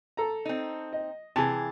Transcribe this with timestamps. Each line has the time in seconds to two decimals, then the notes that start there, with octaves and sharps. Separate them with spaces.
0.17 A4 A#5
0.45 C4 D#4
0.93 D#5
1.36 C3 E3 G#4 A5